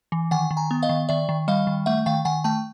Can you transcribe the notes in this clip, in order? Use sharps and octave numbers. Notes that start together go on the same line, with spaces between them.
E3
D#3 F#5 G#5
D#3
G#5 A#5
B3
D#5 F5
D#3
D#3 D5 E5
D#3
G3 D#5 F5
D#3
A3 E5 F#5
D#3 F5 G5
D#3 F#5 G#5
A3 G5 A5